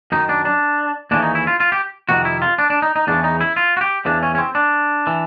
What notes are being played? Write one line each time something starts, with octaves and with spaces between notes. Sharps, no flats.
F#2 D#3 D#4
D4
D4
D#2 C#3 E3 D4
D#4
E4
F4
F4
G4
F2 C3 D#3 F#4
E4
F4
D4
D4
D#4
D#4
E2 C#3 E3 D4
D#4
E4
F4
F#4
G4
E2 C#3 E3 D4
C#4
C#4
C4
D4
E3